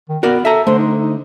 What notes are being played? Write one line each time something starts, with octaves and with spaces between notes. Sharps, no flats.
D#3
B3 F#4 A#4 D5
A4 E5 A#5
D3 A3 C5
D#4
D#4